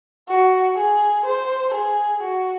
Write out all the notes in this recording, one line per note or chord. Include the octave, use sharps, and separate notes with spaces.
F#4
G#4
C5
G#4
F#4